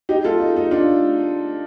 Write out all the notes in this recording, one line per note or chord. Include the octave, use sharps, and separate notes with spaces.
D#4 G4
F4 A4
D#4
D#4
D4 F4